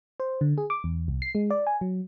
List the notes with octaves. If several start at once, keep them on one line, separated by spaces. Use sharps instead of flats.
C5
D3
G#4
D6
E2
C2
C7
G#3
D5
G#5
F#3